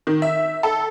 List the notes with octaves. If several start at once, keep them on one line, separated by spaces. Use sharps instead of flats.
D#3
E5
A4